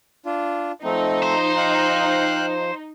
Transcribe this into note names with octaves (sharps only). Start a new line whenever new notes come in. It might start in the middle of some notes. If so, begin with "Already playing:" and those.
D4 F4
F3 A3 C4 D#4
C5
F5 G5 F#6